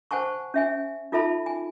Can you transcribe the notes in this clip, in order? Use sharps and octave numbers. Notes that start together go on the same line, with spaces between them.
C5 F#5 G#5 A5 C#6
C#4 E5 G#5
D#4 F4 A4 E5 A5 B5
G#5